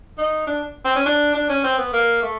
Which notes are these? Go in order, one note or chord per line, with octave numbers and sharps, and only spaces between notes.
D#4
D4
C4
C#4
D4
D4
C#4
C4
B3
A#3
A3